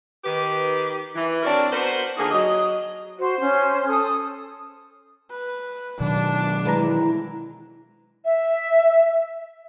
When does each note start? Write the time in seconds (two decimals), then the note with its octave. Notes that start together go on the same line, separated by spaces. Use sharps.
0.25 D#3 G4 B4
1.15 E3
1.43 C4 D4 F#4 A#4 C#5 D5
1.72 B3 F#4 A#4 C5
2.17 D3 F3 A#3 D#4 G#4
2.31 F#3 D#5
3.19 F#4 C5
3.40 C#4
3.88 A4 D#6
5.31 B4
6.00 B2 D#3 F#3 D4
6.65 E3 G#3 B4 A#5
8.25 E5